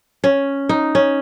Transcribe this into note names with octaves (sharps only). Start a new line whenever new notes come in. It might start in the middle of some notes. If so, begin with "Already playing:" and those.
C#4
D#4
C#4